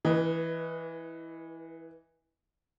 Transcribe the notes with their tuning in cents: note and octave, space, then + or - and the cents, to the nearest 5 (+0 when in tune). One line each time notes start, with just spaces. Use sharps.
E3 +0 B4 -35 D#5 +0